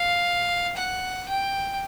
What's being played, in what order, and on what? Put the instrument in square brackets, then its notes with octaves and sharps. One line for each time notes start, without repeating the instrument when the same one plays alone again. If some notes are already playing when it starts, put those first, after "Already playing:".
Already playing: [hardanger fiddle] F5
F#5
G5